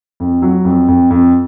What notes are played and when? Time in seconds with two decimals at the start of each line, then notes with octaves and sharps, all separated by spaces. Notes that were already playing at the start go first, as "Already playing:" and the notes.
0.20 F2
0.42 F#3
0.65 F2
0.88 F2
1.11 F2